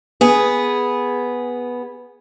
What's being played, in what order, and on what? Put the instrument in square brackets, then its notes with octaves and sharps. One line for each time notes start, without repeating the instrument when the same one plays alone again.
[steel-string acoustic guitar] B3 G#4